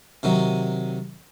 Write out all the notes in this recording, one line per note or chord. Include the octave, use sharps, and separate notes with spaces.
C3 D#3 F#3